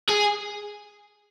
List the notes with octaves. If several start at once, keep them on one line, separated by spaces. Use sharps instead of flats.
G#4